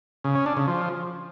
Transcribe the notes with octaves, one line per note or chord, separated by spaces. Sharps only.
C#3
C#4
D4
C#3
F3